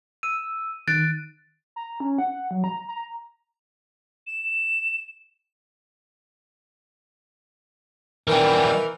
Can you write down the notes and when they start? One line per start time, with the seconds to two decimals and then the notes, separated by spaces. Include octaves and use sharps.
0.23 E6 D#7
0.88 D#3 F#6 A6 D7
1.76 A#5
2.00 C#4
2.18 F#5
2.51 F#3
2.64 A#5
2.88 A#5
4.27 E7
8.27 D#3 E3 G3 A#4